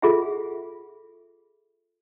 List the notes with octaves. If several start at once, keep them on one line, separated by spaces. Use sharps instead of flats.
F4 G#4 A4 E5 F#5